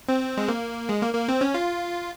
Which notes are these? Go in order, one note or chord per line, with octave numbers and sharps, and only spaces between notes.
C4
G#3
A#3
G#3
A#3
A#3
C4
C#4
F4